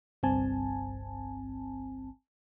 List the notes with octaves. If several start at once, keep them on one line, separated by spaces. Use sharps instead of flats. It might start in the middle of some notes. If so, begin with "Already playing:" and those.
G1 C2 G2 C4 G#5 A5